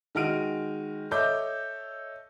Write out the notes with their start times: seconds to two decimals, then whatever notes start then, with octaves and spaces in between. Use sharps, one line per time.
0.15 D#3 G#3 F#4 F6 D7 D#7
1.11 A4 C#5 D#5 E5 D6 G6